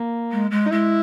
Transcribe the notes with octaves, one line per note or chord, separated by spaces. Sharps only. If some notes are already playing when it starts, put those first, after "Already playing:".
Already playing: A#3
G#3
G#3
D#4
G#3 E4